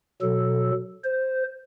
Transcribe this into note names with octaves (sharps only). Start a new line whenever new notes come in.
B2 F#3 A4
C5